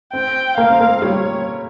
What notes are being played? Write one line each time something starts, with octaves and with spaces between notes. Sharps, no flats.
C4 G5
A#3 F5
C4
A#3
G3 C#5